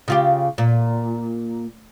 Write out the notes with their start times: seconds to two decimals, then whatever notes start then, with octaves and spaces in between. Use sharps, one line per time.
0.08 C#3 F4 G4
0.58 A#2